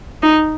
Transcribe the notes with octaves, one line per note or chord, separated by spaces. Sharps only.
D#4